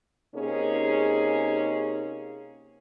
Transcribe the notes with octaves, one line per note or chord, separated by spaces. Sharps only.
C3 A#3 C#4 D#4 G#4